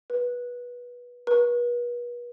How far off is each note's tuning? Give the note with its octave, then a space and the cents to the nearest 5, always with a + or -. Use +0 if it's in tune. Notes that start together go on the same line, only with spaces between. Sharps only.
B4 -20
B4 -40